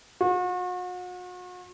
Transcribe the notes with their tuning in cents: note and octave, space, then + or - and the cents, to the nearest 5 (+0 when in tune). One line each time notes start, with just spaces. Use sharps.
F#4 -40